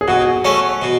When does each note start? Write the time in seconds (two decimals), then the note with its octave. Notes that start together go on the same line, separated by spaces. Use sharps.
0.01 G#4
0.08 B2 F#4
0.44 A3 C#4
0.82 B2